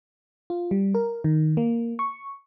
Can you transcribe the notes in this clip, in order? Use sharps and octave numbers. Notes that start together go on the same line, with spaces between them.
F4
G3
A#4
D#3
A#3
C#6